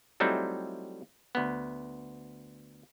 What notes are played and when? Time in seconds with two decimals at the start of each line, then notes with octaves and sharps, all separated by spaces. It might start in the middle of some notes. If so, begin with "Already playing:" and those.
0.20 F#3 G3 A3 C4 D#4 E4
1.35 D2 B3